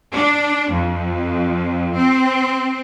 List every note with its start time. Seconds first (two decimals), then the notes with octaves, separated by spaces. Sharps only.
0.13 D4
0.71 F2
1.96 C4